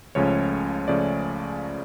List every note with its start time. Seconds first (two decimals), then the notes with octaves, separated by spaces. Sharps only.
0.15 C#2 C#3 F3 A3 C#4 C#5
0.88 C#3 F3 A3 C#4 D5